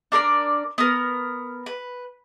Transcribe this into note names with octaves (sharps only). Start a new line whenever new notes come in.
D4 A4 A#4 D5
B3 A#4
B4